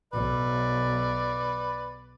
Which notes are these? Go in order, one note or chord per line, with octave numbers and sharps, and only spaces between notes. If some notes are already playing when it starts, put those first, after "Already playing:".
B1 B4 D5